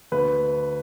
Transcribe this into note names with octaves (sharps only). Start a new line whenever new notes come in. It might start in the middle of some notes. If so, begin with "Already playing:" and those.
D2 B4